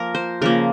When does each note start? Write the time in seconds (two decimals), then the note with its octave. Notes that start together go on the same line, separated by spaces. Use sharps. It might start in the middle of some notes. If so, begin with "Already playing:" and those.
Already playing: F3 A#3 A#4
0.15 C5
0.41 C#3 F3 A#3 A#4